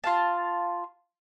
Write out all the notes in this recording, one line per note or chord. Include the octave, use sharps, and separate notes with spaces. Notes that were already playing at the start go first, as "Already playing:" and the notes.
F4 F5 A5